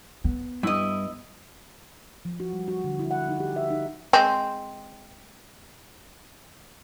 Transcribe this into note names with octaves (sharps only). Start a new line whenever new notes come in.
B3
G2 E4 D#5
F3
F#4
G3
F#4
D3
E4
F#5
D#4
G4
E5
D#4
G#3 C4